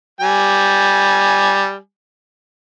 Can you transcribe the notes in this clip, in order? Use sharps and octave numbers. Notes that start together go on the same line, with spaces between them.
G3 G#5